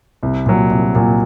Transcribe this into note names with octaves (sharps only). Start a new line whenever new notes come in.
C2
A#2 F#3
C2
A#2 F#3